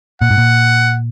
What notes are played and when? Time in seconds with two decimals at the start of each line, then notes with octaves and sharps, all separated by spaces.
0.21 A#2 F#5
0.31 G#2
0.38 A#2